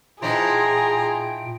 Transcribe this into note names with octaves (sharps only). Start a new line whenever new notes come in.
A#2 E3 F3 D#4 G#4 G5 A#5 C6